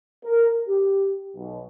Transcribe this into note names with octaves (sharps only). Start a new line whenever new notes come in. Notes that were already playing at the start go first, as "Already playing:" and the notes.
A#4
G4
B1